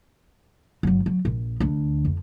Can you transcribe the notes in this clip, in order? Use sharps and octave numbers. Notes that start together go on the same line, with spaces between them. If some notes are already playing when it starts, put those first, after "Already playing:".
G1 F#3
F#3
A#1
D2 D4
F2